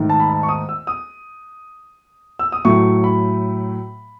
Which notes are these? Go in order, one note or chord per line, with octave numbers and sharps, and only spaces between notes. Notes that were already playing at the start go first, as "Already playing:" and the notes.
Already playing: G#2 D#3 A3
A5
B5
A5
C#6
D#6
E6
D#6
E6
D#6
A2 F#3 A3 C#6
B5